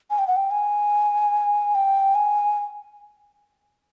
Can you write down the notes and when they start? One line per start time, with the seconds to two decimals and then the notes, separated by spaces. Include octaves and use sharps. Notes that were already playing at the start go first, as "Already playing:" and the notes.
0.10 G#5
0.19 G5
0.27 F#5
0.36 G5
0.51 G#5
1.75 G5
2.15 G#5